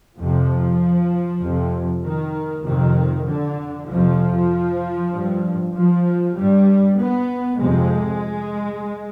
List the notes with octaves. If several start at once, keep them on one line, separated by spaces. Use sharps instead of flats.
F2 C3 F3
F2 C3
D#3
F2 C3 D#3
D3
F2 C3 F3
G2
F3
G2 G3
B3
F2 C3 G#3